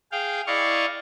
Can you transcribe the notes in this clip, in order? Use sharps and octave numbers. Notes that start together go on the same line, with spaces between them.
G#4 F5 G5
E4 D5 D#5 F5 C#6